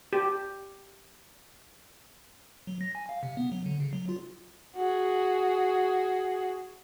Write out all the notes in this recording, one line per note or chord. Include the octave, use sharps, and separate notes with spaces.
G4
F#3
A#6
G#5
F5
C3
B3
F#3
D3
C#3
F#3
F4
F#4 G#4